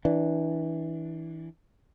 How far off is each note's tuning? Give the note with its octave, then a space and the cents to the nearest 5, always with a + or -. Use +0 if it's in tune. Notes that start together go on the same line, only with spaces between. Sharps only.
E3 -20 D4 +0